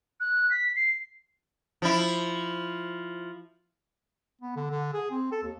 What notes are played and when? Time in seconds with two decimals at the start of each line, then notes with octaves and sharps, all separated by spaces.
0.20 F#6
0.51 B6
0.76 C7
1.82 F3 E4
4.41 B3
4.56 D3
4.70 D3
4.93 G#4
5.11 C4
5.32 A4
5.43 D#2